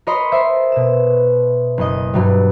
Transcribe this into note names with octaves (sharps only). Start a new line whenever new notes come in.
A#4 C#5 D#5 B5 C6
C5 E5 C7
B2 E7
F#1 D#5
G2 F#3 G3